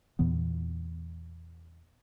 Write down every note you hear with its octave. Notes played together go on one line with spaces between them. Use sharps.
E2 A#2 E3 B3